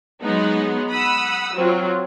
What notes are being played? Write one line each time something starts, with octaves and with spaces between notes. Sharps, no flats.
F#3 G#3 B3 D#4
F#5 B5 D#6 E6
F#3 C4 F4